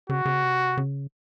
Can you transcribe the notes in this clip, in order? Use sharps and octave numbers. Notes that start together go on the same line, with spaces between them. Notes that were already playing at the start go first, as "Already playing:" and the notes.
C#3 F#4
C#3
C3
C#3